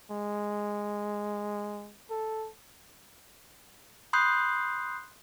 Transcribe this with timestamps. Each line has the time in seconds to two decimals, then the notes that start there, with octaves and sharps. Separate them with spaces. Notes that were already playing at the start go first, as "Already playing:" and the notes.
0.10 G#3
2.10 A4
4.13 B5 C6 D#6 F#6 G6 C7